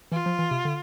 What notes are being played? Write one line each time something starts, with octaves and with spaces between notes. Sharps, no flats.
E3 F4
F3
E3
C3
D3